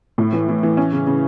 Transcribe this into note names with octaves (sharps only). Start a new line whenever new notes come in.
A2
E3
E3
E3
C#4
C#3
C#3